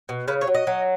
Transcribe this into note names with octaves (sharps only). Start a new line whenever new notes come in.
B2
C#3 B4
C#5
F#3
D#5
F#3